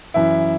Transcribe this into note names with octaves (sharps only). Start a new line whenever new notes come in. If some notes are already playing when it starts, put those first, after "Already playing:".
F#2 E3 E4